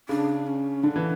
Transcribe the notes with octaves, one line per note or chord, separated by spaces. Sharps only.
C#3 D4
C#4
D3 D4
E3